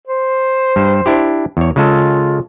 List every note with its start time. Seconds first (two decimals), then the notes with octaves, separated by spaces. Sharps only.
0.07 C5
0.76 G2
1.06 D4 E4 G4
1.57 E2 C#5
1.76 C#3 G#3 F4 A4